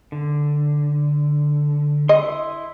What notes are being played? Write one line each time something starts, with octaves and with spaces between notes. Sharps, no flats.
D3
E4 D#5 C6